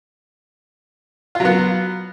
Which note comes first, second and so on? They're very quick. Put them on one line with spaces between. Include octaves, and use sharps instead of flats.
F4 F#3 B3